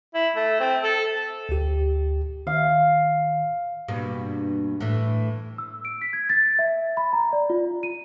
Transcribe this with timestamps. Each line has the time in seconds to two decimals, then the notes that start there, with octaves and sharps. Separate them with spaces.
0.15 E4
0.36 A3
0.60 C4
0.84 A4
1.49 D2 G4
2.47 D#3 F5
3.88 G2 B2 A#3
4.81 A2 E3
5.58 E6
5.85 D7
6.02 B6
6.13 G#6
6.29 A6
6.59 E5
6.97 B5
7.13 A#5
7.33 D5
7.50 F4
7.83 D#7